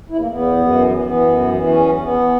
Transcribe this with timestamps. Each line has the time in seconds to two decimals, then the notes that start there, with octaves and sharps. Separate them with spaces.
0.10 E2 E4
0.20 A#3
0.26 E2 B3
0.42 F#2
0.57 F#2
0.73 E3
0.90 E3
1.05 E3 B3
1.21 F#2
1.37 E3
1.52 E3
1.68 E2 C#4
1.85 E2
2.00 E2 B3